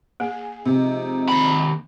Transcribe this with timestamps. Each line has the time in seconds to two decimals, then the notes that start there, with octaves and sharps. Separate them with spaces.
0.20 A#3 G#4
0.66 C3 F3 G#3 D#4
1.29 D#2 B5